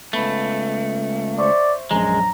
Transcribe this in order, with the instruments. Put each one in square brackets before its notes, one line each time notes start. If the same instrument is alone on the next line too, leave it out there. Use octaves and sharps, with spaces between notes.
[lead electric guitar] C#2 A3 [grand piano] B3 B5
[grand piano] C5 E5 C#6 [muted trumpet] D5
[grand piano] A#1 F#2 [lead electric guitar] G#3 [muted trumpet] A#5